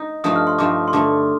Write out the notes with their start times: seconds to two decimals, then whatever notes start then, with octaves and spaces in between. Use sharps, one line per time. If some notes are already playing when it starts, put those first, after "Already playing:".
Already playing: D#4
0.24 G2 F3 A3 D#4 D#6
0.36 F6
0.47 C6
0.58 G2 F3 A3 D#4 D6
0.88 C6
0.93 G2 D3 A3 D6